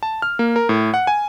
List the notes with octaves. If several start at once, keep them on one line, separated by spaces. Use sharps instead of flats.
A5
F6
A#3
A#4
A2
F#5
G#5